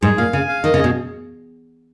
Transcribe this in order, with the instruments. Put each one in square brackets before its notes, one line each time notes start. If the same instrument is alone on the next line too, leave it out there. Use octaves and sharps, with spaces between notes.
[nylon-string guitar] G#2 [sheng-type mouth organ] G#4
[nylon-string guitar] A#2 [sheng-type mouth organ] F5
[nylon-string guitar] C#3 [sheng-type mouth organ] G#5
[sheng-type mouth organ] F5
[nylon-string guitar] D#3 [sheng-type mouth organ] D#5
[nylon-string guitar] C#3
[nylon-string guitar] B2 [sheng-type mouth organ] G#4